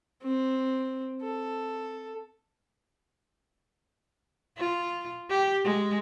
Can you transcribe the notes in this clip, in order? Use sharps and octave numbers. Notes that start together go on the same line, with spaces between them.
C4
A4
F4
G4
G#3